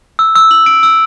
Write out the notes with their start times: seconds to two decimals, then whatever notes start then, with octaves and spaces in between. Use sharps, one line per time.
0.19 E6
0.35 E6
0.51 F#7
0.66 D7
0.83 E6